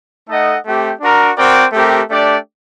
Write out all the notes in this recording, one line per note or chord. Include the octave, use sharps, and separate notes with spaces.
A3 D#4 A4 D#5 F#5
A3 C4 G4
D4 F#4 A#4
C4 F#4 A#4 D5 G5
A3 C4 G4 A#4
A3 D4 G4 D5